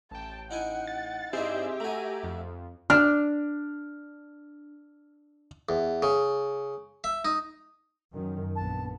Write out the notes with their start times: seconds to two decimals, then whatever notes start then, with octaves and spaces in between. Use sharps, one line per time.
0.11 A1 G5 A5
0.51 D#4 E4 F#5 G#5
0.87 A6
1.33 G2 C4 D#4 E4 G4 G#4 C5 E5
1.80 A3 F#4 G#5 A#5
2.24 F2
2.90 D4 F6
5.69 E2
6.02 C#3
7.04 E5
7.25 D#4
8.13 F#2 D#3
8.56 A#1 B3 A5